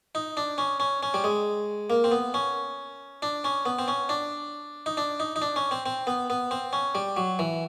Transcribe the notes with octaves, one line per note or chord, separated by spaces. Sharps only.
D#4
D4
C#4
C#4
C#4
G3
G#3
A#3
C4
B3
C#4
D4
C#4
B3
C4
C#4
D4
D#4
D4
D#4
D#4
D4
C#4
C4
C4
B3
B3
C4
C#4
G3
F#3
E3